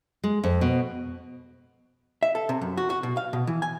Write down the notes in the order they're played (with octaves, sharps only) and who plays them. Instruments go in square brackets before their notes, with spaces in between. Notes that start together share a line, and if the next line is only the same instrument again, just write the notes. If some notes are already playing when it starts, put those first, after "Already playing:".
[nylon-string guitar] G#3
F2
B2
[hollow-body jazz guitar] E5
A4
C3
F#2
F#4
F#4
B2
F5
B2
E3
G#5